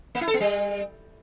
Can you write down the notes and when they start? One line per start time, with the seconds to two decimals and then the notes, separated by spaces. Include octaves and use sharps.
0.15 A#3
0.21 E4
0.27 A4
0.34 B3
0.40 G3